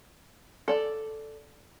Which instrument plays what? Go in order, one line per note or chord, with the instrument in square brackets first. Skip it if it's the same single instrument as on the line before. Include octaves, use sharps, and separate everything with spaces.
[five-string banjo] A4 D5